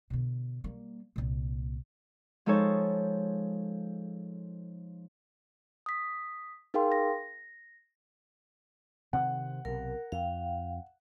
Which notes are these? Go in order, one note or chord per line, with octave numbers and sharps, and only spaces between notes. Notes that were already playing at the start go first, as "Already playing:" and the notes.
B2 D3
G3 A#3
C2 A#2
F3 G#3 D#4 A4 C5 C#5
D#6 B6
D#4 G#4 A#4 F5 G5 C6
A#6
C3 D#3 C4 F#5
B1 C3 A#4
F2 F5 G5